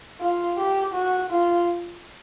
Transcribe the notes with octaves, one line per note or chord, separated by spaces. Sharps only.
F4
G4
F#4
F4